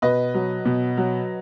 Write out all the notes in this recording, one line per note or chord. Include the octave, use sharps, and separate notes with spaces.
B2 B4 D#5
F#3
B2
F#3